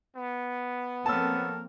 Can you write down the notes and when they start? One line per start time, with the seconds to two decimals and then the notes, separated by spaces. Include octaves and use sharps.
0.15 B3
1.06 F3 A#3 C4 A4 A#4 C#5 A5 E6